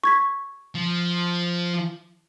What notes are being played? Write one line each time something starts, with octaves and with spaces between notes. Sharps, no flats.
C#6 G#6 B6
F3